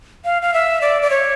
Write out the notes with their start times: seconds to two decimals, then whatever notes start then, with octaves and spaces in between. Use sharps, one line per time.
0.25 F5
0.42 F5
0.54 E5
0.82 D5
1.02 D5
1.10 C#5